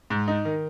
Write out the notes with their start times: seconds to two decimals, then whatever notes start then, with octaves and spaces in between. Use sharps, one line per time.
0.10 G#2
0.28 D#4
0.45 D#3